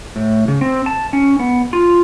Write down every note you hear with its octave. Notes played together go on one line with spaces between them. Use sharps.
A2
C#3
C4
A5
C#4
B3
F4